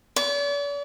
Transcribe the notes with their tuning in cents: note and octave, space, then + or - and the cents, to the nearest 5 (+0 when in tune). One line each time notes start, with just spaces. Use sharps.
D5 -45